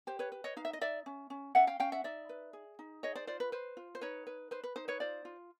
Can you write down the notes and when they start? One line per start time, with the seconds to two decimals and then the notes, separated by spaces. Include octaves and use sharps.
0.07 G4 C5
0.19 B4 C#5
0.32 B4
0.44 C#5 D#5
0.57 D#4 F5
0.65 E5
0.73 D#5
0.81 D#4 D5 E5
1.06 C#4
1.30 C#4
1.55 C#4 E5 F#5
1.67 F5 G5
1.80 C#4 F5 G5
1.92 E5 F#5
2.04 D#4 D5 E5
2.29 B4
2.53 G#4
2.79 D#4
3.03 G#4 C#5 D#5
3.15 C5 D5
3.27 F4 C5 D5
3.40 B4
3.52 B4 C5
3.77 F4
3.95 C5
4.01 D#4 B4 C#5
4.27 B4
4.51 B4 C5
4.64 B4
4.76 D#4 C5
4.88 B4 C#5
5.00 F4 C5 D5
5.25 F4